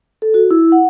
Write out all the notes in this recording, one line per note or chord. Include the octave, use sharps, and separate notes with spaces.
A4
F#4
E4
F#5